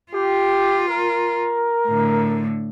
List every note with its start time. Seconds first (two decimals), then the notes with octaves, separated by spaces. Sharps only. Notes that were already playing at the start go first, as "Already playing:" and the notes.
0.12 F4 G4
0.88 A#4
1.87 A2 D3